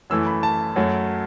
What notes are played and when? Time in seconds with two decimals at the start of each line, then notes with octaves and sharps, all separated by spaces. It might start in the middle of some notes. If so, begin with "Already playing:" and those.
0.10 F#2 E3 A3 E6
0.26 B5
0.43 A5
0.76 F#2 F#3 A3